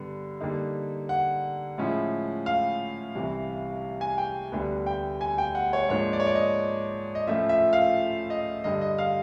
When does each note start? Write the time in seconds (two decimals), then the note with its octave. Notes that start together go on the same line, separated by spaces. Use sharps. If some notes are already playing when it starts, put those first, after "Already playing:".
Already playing: G2 D3 G3 B3
0.40 D3 G3 A#3 D#4
1.09 F#5
1.78 A2 F3 G#3 C#4 E4
2.46 F5
3.15 C2 C3 E3
4.01 G#5
4.18 G5
4.52 D2 D3 G3 B3
4.86 G5
5.21 G#5
5.38 G5
5.55 F#5
5.73 C#5
5.89 G#2 F3 A#3 D4 C#5
6.13 D5
6.20 C#5
6.27 D5
6.35 D#5
7.15 D#5
7.27 A2 F3 A3 C#4 F4 E5
7.49 E5
7.73 F5
8.30 D#5
8.64 G2 D3 G3 D#5
8.81 D#5
8.98 F5